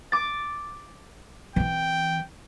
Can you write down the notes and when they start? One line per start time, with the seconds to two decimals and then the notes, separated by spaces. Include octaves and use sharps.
0.12 D6 A6
1.56 E3 C4 G5